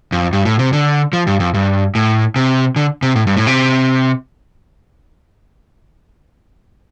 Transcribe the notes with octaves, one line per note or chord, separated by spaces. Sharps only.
F2
G2
A2
C3
D3
F3
G2
F2
G2
A2
C3
D3
C3
A2
G2
A2
C3